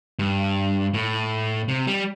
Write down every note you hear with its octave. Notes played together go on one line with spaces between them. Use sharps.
G2
A2
C3
G3